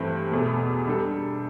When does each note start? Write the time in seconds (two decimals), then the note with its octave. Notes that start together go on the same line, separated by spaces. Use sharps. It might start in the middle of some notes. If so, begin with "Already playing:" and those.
Already playing: G2 E3 A3 C4
0.31 E2 B2 A3
0.87 C3 G3 D4 A4